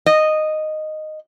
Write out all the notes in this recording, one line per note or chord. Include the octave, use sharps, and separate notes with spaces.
D#5